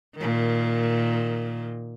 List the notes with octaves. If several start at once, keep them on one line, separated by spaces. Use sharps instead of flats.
A#2 D#3